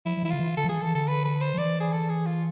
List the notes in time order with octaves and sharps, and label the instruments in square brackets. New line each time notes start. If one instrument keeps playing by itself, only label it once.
[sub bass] F3 [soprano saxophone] E4
[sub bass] F3
[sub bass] E3 [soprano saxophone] E4
[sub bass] D3 [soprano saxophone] F4
[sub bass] E3
[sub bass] D3 [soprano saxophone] A4
[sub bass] F3
[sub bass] E3 [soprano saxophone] G#4
[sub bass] E3 [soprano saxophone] A4
[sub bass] D3 [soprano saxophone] A4
[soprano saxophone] B4
B4
C5
[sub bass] F3
[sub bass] E3 [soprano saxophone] D5
[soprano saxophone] G#4
A4
G#4
F4